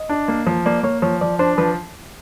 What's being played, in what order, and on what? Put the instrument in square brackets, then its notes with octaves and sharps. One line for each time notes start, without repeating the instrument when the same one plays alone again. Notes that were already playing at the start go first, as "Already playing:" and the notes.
Already playing: [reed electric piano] D#5
[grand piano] D4
A#3
F3
[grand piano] A#3 [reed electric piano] D5
[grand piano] A#3 [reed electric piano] C#5
[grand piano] F3 [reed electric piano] C#5
[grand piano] F3 [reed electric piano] D5
[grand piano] D4 [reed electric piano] C5
[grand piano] F3 [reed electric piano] B4